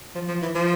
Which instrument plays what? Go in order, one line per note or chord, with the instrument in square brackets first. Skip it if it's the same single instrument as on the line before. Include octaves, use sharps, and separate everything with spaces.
[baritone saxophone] F3
F3
E3
F3